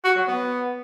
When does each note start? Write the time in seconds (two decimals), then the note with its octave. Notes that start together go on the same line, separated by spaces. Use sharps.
0.04 F#4
0.16 F#3
0.28 B3